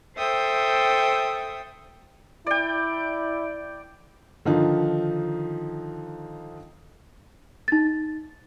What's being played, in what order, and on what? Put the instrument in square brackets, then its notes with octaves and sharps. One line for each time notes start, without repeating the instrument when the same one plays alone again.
[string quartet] A4 C5 E5 G5 D#6
[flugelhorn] E4 [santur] D5 G5
[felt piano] D3 D#3 F3 D#4
[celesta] D#4 A6